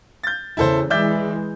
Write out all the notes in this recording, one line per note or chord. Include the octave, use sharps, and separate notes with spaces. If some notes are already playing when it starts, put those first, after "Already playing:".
G6 A6
E2 C#3 E4 A4 C5
E3 G#3 D5 E5 G6